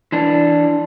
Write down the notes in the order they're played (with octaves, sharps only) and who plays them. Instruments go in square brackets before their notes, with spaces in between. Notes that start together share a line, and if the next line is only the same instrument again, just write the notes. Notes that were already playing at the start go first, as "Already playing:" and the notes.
[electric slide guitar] E3 D4